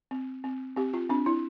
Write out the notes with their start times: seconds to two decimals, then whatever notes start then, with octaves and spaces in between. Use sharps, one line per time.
0.11 C4
0.44 C4
0.76 C4 G4
0.94 F4
1.09 C4 D4
1.26 E4